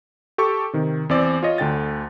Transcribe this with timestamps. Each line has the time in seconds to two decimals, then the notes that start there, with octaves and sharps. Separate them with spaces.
0.38 G4 A4 C#6
0.73 C3 D#3
1.09 E2 C4 D5
1.43 F4 C#5 D#5
1.58 D2 D3 G5 A6